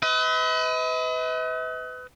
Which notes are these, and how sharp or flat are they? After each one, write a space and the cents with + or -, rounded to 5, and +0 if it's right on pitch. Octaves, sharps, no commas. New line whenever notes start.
B4 +30 D#5 +45